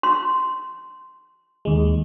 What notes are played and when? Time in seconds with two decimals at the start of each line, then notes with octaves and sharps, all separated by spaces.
0.03 C6
1.65 D#2 G#3